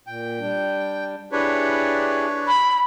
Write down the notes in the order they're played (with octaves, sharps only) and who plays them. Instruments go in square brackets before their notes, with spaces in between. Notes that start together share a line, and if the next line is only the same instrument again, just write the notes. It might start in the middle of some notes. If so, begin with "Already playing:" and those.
[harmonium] A#2 [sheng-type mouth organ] G5
[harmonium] G3 D4
[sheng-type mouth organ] D4 B4 C#5 [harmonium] E4 G4 G#4
[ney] B5